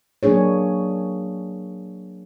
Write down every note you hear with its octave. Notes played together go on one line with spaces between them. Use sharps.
F#3 A#3 D4 G#4 C#5